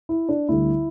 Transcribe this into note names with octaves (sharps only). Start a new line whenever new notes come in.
E4
D4
D2 D3 G3 E4